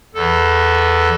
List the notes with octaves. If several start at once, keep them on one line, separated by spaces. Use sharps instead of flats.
E2 E3 A4